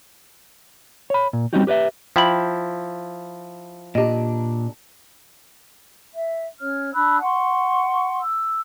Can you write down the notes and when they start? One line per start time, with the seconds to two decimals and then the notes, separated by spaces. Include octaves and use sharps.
1.10 C#5 B5
1.33 A#2
1.53 G3 C4 C#4 D#4 F#4 G4
1.67 G4 B4 D5 E5
2.16 F3 E4 G5 B5 F#7
3.95 A#2 D4 G4 D#5
6.13 E5
6.61 C#4 C#5 F6
6.94 D4 B5 E6 F#6
7.21 F#5 C6 C#6
8.22 E6